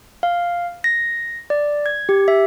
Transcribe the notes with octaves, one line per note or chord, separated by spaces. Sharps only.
F5
A#6
D5
G#6
G4
E5